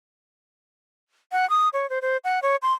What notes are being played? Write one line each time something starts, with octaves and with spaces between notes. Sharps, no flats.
F#5
D#6
C#5
C5
C5
F#5
C#5
C6